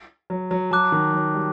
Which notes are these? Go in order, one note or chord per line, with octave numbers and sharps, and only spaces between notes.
F#3
F#3
F#3 A5 D6 F#6
D#3
F#3
G3